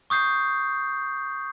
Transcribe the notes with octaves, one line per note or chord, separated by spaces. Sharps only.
C#6 D#6 G6 C7